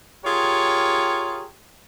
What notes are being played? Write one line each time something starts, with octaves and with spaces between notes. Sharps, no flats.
F4 G4 G#4 A#4 C#5